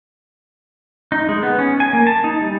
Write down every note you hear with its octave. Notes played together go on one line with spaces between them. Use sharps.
D#4
G#3
B3
C#4
G#5
A#3
A5
D#4
G3